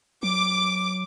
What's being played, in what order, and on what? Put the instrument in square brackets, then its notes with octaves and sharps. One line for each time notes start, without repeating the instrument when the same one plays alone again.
[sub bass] F#3 [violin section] D6